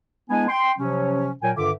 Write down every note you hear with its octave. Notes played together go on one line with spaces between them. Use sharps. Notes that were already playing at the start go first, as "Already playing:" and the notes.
G#3 B3 D4 E4 G#5
G5 C6
C3 F3 F#3 C#4
A#2 F#3 A#4 G5 G#5
G2 D3 D#3 F4 E5 D6